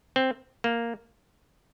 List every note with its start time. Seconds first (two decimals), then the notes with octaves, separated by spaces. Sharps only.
0.16 C4
0.64 A#3